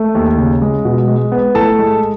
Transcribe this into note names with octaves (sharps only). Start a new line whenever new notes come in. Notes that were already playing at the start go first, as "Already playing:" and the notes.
Already playing: A3
D#2
C#3
G#3
B2
G#3
B3
A2 A4 A5
G#3